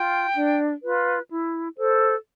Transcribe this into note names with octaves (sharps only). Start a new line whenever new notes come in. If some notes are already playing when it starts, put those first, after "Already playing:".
Already playing: F4 G5
D4
F4 B4
E4
A4 C5